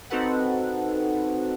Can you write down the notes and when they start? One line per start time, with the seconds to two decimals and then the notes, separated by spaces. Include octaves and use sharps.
0.10 C4 D#4 F#4 A4 B4 F#5